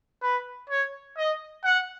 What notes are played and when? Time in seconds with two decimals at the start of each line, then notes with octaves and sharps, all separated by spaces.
0.22 B4
0.70 C#5
1.17 D#5
1.64 F#5